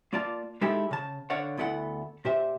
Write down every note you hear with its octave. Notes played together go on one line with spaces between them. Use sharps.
A#3 F4 D5 F5 A5
G#3 D#4 E4 G4 A4
C#3 A5
D3 C#5 D5 F5 F#5
D2 B3 E4 A4 F#5
A#2 G4 C5 E5